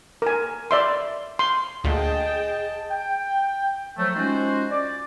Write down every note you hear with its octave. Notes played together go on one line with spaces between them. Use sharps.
A#4 G#5
D5 E5 C6
C6
D2 A#2 G#4 D#5 G5 A5
G5
F3 F#3 A3
G#3 C#4 D#4 F4 F#4 C5
D5